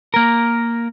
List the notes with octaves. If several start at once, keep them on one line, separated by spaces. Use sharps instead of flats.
A#3 A#4